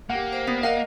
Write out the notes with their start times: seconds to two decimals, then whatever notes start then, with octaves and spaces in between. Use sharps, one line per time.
0.10 A#3 G4 F#5
0.33 C5
0.47 B3
0.63 A#4 D#5 F5 F#5